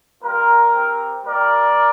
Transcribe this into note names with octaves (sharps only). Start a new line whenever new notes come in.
G3 A#3 F4 A#4
C4 G4
G3 A#3 G4 A#4 D5